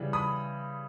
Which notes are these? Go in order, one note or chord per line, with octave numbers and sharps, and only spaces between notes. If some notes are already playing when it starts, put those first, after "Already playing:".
Already playing: C#3 E3 G3
B5 D#6